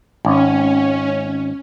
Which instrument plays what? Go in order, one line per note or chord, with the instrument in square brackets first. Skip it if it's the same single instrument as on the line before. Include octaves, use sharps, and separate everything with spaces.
[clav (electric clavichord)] G#1 [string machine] C#4